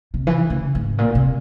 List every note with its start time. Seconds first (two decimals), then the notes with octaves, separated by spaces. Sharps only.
0.14 C3
0.27 E3
0.50 C#3
0.75 G#2
0.98 A#2
1.15 C3